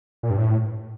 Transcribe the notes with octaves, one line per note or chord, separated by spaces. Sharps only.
A#2
G2
A2